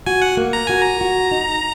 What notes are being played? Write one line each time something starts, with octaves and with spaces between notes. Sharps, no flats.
F#4 G#5
F#5
A#3
A#5
F#4 G#5
A#5
F#4
D#4